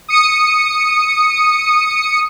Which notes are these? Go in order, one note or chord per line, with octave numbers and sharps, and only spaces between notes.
D#6 C#7